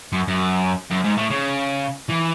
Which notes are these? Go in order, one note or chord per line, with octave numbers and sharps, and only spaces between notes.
F#2
F#2
F#2
G#2
A2
C#3
E3